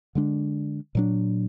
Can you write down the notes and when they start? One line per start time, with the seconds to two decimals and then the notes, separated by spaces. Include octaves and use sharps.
0.15 D3 G#3 D4
0.95 A#2 F#3 D4